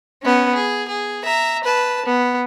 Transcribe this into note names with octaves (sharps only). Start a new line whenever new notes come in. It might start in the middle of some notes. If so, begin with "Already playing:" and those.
B3 C#4
G#4
G#4
E5 A#5
B4 A5
B3